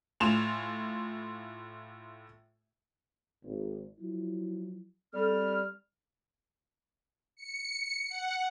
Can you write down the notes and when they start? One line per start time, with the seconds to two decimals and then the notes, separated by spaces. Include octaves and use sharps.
0.20 A2 F4 G#5 E7 F7
3.44 G#1
3.99 F3 F#3 E4
5.14 G3 C4 G4 A4 F6
7.36 C#7
8.09 F#5